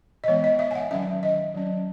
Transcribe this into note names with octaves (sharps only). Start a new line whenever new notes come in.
D#5
E3 G#3 B3 C#5
D#5
E5
G#5
F#5
D#3 F#3 C#4 E5
D#5
F#3 C#4